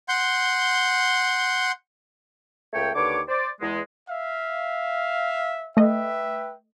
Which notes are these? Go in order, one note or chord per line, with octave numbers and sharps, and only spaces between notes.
F#5 C6 G6
C#2 A3 A#3 C#5 G5
D#2 D3 B4 C#5 D6
C5 D5
E2 G#3
E5 F5
A3 B4 D#5 E5 G5